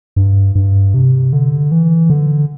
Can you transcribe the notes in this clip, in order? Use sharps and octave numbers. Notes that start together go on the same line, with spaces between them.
G2
G2
C3
D3
E3
D3